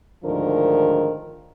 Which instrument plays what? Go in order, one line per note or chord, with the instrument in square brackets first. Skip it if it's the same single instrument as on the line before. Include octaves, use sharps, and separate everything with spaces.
[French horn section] D2 G#2 D#3 F3 D4 A#4